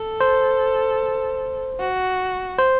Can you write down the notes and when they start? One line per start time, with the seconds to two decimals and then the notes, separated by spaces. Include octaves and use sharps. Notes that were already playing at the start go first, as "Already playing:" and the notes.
Already playing: A4
0.21 C5
1.80 F#4
2.58 C5